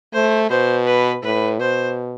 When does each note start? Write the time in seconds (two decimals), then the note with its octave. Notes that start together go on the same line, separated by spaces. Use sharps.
0.13 A3 C5
0.49 B2 C5
0.86 B4
1.23 A2 B4
1.59 B2 C5